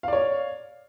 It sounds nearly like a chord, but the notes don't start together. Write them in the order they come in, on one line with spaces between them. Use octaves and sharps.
F5 D5 C#5